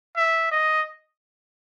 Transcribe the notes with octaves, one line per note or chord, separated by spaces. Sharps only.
E5
D#5